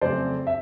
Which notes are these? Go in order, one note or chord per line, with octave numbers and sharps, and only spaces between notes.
F2 C#3 F#3 A3 C4 C5 D5
E5